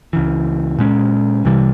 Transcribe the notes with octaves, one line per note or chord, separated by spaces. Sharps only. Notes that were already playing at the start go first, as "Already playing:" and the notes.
C#2 C#3 E3
A#2 G#3 C#4
C2 C3 E3 G3